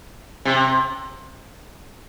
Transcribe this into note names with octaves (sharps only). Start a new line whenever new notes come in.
C3